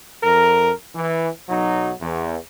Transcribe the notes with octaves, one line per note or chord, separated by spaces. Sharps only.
F2 A#4
E3
B1 F#3 D#4
E2